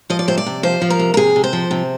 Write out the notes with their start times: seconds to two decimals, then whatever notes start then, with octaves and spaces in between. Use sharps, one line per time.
0.10 F3 D#5
0.19 D5
0.28 C3 C5
0.38 D5
0.46 C3
0.63 F3 C5
0.82 F3
0.90 A#4
0.99 C3
1.14 A#4
1.17 C3 G#4
1.36 C3
1.44 C5
1.53 F3
1.71 C3